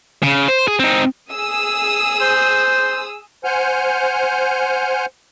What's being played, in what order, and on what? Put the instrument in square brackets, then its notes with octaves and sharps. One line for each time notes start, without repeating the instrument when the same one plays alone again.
[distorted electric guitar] C#3
C5
G#4
C4 D#4
[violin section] G#4 D#6 E6
[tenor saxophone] C5
[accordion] C5 F#5 G#5 F6 G6